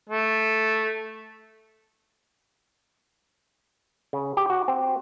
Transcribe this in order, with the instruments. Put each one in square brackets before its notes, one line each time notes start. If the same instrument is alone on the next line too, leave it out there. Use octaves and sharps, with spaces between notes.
[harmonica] A3
[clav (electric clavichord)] C#3
G4
F#4
C4